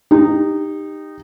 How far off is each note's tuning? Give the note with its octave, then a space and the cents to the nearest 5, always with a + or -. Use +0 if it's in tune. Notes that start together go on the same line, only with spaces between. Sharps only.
D#4 -15 G4 +15